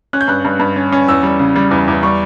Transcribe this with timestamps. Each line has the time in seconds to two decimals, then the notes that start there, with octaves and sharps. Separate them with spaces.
0.13 C#4 F#6
0.21 G6
0.28 G2 F#6
0.45 G2
0.60 G2
0.76 C#4
0.92 C#4
1.08 E2 E6
1.23 G3
1.39 C#3
1.56 G3
1.71 E2
1.88 E2
2.03 G3 C#6